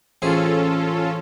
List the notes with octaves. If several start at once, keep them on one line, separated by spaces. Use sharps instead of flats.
A1 C4 C#4 F4 G#4 A4